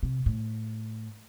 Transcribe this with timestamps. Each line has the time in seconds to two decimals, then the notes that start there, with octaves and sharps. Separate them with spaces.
0.03 C3
0.26 A2